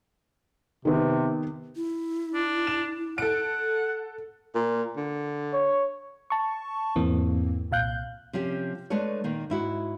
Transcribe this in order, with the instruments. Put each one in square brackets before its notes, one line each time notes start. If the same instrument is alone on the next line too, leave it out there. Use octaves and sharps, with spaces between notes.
[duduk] C3 [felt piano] D#3 B3
[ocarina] E4
[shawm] D4
[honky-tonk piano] E7
[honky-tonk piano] A4 D7 [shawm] F#5
[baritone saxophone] A#2
D3
[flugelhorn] C#5
[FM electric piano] A5 C#6
E2 G#2 E3 A#3 C4
C2 A#2 F5 F#6 G6
[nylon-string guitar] C3 F3 C#4 G4
G#3 A3 D4 A4 B4 C#5
A#2 D#3 A#3
G#2 E4 F#4